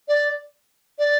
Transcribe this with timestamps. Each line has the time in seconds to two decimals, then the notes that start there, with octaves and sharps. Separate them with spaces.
0.08 D5
0.99 D5